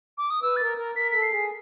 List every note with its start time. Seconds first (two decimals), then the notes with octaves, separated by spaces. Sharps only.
0.18 D6
0.30 D#6
0.42 B4 E6
0.56 A#4 A6
0.77 A#4
0.95 A#4 B6
1.11 A4 B6
1.22 C7
1.32 G#4